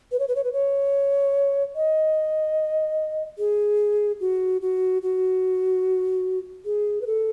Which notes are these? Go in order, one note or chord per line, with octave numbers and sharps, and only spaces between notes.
B4
C#5
B4
C#5
B4
C#5
D#5
G#4
F#4
F#4
F#4
G#4
B4
A4